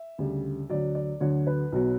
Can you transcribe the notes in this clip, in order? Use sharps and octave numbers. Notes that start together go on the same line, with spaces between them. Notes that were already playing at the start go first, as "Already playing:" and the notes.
Already playing: E5
D2 C#3 G3
D2 D3 F#3 D5
D5
D2 D3 F#3 C#5
B4
B1 B2 F#3